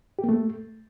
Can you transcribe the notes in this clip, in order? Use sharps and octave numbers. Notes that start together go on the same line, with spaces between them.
G4
A#3
A3